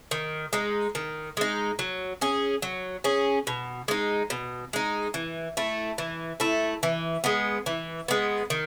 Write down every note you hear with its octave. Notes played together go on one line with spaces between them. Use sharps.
D#3
G#3 D#4
D#3
G#3 D#4
F#3
C#4 G#4
F#3
C#4 G#4
B2
G#3 D#4
B2
G#3 D#4
E3
A3 E4
E3
A3 E4
E3
G#3 B3
E3
G#3 B3
D#3